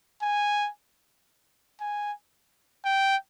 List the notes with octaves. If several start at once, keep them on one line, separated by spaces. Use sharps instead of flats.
G#5
G#5
G5